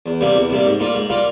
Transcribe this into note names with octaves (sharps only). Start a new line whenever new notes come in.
E2
C3 G3 A#3
E2
C3 G3 A#3
G#2
G3 A#3 F4
G#2
G3 A#3 F4